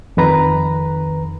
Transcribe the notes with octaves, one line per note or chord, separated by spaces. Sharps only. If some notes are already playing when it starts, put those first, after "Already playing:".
F2 D#3 B4 A#5